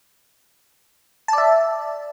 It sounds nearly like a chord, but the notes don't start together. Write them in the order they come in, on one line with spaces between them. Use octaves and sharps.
A5 D5 E5